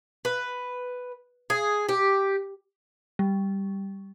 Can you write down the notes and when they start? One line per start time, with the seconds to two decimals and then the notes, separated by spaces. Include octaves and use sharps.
0.25 B4
1.50 G#4
1.89 G4
3.19 G3